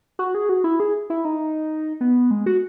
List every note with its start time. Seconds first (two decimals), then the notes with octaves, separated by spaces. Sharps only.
0.19 F#4
0.35 G#4
0.49 F#4
0.64 E4
0.80 G#4
1.10 E4
1.25 D#4
2.01 B3
2.31 G#3
2.46 F#4